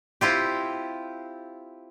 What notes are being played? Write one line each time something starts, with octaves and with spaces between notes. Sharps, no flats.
C4 E4 F4 G4